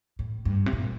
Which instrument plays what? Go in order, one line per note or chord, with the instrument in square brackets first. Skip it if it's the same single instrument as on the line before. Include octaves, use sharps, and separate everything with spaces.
[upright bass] A2
G2
C3
A#2